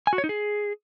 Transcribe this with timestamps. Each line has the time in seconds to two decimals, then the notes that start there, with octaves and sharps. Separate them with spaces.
0.07 G#5
0.13 F#4
0.18 C#5
0.24 D#4
0.29 G#4